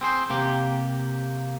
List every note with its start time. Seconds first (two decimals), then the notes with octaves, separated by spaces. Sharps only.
0.01 C4 G#4 C5
0.30 C3 A#3 G4